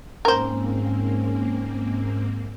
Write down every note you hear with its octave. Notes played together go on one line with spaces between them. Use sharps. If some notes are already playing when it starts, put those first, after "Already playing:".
G#2 A#3 C4 C#4 A#4 C5